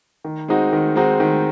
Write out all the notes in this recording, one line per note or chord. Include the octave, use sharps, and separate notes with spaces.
D#3
G#3 C4 D#4 F#4
D#3
G#3 C4 D#4 F#4
D#3